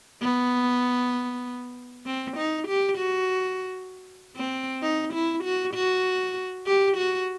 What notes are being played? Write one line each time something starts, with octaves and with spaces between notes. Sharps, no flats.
B3
C4
D#4
G4
F#4
C4
D#4
E4
F#4
F#4
G4
F#4